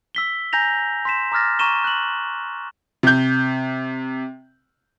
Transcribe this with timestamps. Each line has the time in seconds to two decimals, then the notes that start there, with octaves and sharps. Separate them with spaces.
0.15 E6 B6 G7
0.53 G#5 A#5 G6 A#6 F7
1.05 C6 B6 E7
1.32 A#5 D6 E6 F6 A6 A#6
1.59 A#5 C#6 D#7 E7 G7
1.84 F#6 F#7
3.03 C3 G6